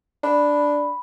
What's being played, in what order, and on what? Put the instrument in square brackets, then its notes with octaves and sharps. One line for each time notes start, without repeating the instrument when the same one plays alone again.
[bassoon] D4 [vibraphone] B5